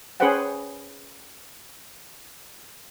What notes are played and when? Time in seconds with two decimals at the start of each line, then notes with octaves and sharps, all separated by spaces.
0.20 C#4 G#4 B4 C5 F#5 G5